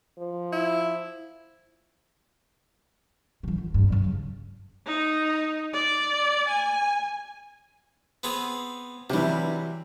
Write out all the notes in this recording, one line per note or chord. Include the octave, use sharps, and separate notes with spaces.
F3
E4
D#3 E3
F4
G2
D1 F#2
C#3
D#4
D5
G#5
B3 C4 G#4
C3 E3 F#3 G3